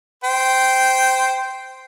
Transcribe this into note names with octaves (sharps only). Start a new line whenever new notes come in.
C5 G5